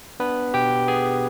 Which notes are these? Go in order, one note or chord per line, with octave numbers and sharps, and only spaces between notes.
B3 D4 B4
B2 G4 G5
B3 G#4 G#5